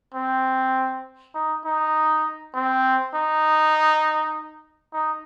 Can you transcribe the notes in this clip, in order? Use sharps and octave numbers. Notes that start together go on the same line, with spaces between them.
C4
D#4
D#4
C4
D#4
D#4